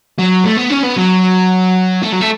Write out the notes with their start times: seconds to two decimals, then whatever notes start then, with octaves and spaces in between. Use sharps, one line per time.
0.19 F#3
0.45 A3
0.58 B3
0.71 C#4
0.84 B3
0.98 F#3
2.03 A3
2.12 F#3
2.21 A3